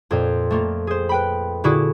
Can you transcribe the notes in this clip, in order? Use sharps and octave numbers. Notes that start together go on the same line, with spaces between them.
F2 A#2 C4
A3 A#3 F4
G#4 C5
B4 G5 B5
A#2 D3 E4 F#4 G#4 A4